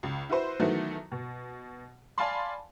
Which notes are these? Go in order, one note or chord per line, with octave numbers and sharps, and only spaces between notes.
C#2
E4 F#4 B4 C5
D#3 E3 F#3 A3 B3 F#4
B2
D5 F5 G#5 A5 B5 C6